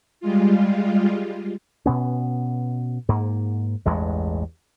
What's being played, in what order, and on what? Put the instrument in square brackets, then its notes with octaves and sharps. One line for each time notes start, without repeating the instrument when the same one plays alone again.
[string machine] G3 G#3 F4
[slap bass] B2 B3 C#4
G#2 A#3
A1 E2 G2 G#3